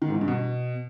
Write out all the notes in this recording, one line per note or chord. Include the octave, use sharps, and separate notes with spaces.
D#3
G#2
E3
G2
B2